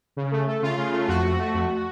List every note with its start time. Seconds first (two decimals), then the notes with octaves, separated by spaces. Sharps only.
0.17 C#3
0.31 A3
0.47 A3 A4
0.62 C#3 F4
0.78 C#3
0.93 A3
1.08 F2 F#4
1.23 A3
1.39 A3
1.54 F2